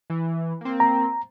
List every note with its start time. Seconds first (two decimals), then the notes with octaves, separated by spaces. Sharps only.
0.10 E3
0.61 A#3 C4
0.80 A#5